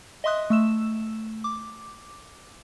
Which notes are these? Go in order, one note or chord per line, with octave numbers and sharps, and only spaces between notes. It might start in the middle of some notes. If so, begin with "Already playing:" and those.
D#5 E5 C6 D#6 F#6
A3 E6 E7
D6